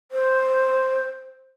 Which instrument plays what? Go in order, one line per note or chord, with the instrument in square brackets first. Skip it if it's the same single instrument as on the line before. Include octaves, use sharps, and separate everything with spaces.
[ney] C5